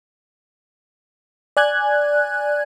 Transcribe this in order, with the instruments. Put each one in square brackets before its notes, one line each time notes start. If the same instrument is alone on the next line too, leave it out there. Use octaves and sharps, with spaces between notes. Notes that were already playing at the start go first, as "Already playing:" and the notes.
[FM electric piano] D5 G#5 F#6 G#6